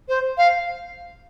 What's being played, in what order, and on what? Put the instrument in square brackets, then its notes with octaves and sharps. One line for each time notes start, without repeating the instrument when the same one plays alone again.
[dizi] C5
F5